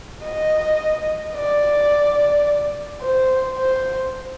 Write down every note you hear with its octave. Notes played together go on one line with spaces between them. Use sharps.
D#5
D5
C5
C5